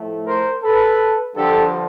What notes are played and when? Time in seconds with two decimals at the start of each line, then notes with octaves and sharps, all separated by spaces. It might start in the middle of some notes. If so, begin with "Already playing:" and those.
Already playing: A2 F3 A3
0.26 A#4 C5
0.62 A4 B4
1.36 G2 D3 F3 G4 A4